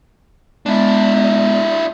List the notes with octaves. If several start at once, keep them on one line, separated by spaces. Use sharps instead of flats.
G#3 B3 D4 E4